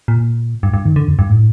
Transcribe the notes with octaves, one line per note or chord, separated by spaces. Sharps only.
A#2
G2
G2
D#3
D3
F2
G2
A2